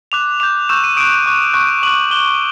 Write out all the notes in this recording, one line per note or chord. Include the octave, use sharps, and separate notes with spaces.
D6 F#6 F7
D6 G6 F7
C#6 E6 G6 E7
D#7
D#6 F#6 D7
C#6 F#6
C#6 F#6
D6 F#6 F#7
D6 F#6 G7